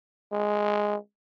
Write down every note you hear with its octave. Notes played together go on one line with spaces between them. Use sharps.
G#3